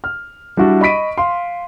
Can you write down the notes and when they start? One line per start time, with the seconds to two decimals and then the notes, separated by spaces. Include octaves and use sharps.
0.04 F6
0.57 G3 D4 E4 F#4
0.81 D#5 B5 C#6 B6 D7 D#7
1.18 F5 C6